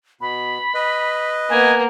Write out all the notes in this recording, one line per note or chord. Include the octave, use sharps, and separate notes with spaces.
B2 B3 B5
B4 D#5
A#3 B3 G#5